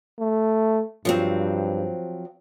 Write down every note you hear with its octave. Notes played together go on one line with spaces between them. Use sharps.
A3
G2 F3 F#3 C4